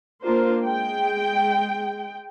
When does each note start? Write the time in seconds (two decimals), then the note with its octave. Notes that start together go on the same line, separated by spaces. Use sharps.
0.22 A#3 D4 F4 A#4 C5
0.64 G#3 G5